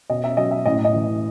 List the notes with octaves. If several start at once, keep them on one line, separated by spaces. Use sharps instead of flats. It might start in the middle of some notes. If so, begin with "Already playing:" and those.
B2 D#5
E5
F#3 D#5
E5
A2 D#5
D#5
E3